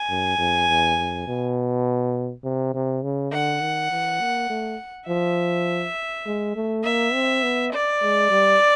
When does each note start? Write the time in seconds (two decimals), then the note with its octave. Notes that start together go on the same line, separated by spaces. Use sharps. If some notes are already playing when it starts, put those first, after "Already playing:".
Already playing: G#5
0.10 F#2
0.39 F2
0.68 E2
0.98 F2
1.28 B2
2.44 C3
2.74 C3
3.03 C#3
3.32 D3 F#5
3.61 D#3
3.91 E3
4.20 A#3
4.50 A3
5.08 F3 E5
6.26 G#3
6.56 A3
6.85 A#3 E5
7.14 C4
7.43 B3
7.72 D5
8.03 G#3
8.31 G3